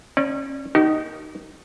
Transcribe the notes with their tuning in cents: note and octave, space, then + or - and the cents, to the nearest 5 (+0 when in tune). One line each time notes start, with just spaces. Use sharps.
C#4 -30 D5 +0
A#3 +0 D#4 +0 G4 -40